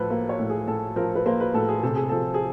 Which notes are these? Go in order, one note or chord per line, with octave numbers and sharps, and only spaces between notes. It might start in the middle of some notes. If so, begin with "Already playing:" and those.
Already playing: A2 F3 A4 B4
A#3
C#5
A2
G#4
A2 A4
F3 A#4
B4
A#3 C5
B4
A2 A4
G#4
C3 A4
G#4
F3 A4
G#4